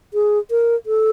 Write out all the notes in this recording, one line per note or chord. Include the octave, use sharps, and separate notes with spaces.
G#4
A#4
A4